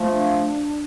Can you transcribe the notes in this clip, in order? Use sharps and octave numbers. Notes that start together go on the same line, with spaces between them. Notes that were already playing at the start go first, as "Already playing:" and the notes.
Already playing: F3 A3
D4